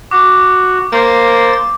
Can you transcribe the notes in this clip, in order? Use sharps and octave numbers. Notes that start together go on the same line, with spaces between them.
F#4 D6
A#3 C5 A6